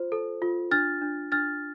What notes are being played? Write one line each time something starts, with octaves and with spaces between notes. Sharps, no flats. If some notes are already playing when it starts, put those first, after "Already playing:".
Already playing: F4 C5
A4
F4
D4 F6 A6
D4
D4 F6 A6